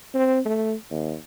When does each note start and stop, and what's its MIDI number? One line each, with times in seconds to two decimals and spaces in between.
0.14 0.40 60
0.46 0.74 57
0.91 1.15 39